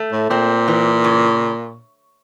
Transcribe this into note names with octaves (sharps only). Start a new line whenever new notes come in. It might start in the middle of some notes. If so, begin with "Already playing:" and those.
Already playing: A3
A2
A#2 C4
E3
C#3